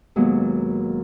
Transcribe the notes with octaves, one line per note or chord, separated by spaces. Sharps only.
D#2 B2 F#3 G#3 A#3 B3